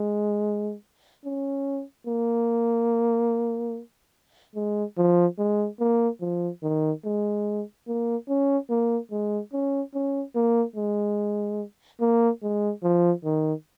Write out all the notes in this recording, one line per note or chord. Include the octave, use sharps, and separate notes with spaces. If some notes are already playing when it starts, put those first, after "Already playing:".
Already playing: G#3
C#4
A#3
G#3
F3
G#3
A#3
F3
D#3
G#3
A#3
C#4
A#3
G#3
C#4
C#4
A#3
G#3
A#3
G#3
F3
D#3